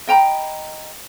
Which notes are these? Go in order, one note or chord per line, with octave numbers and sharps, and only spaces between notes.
D#5 G5 A#5 B5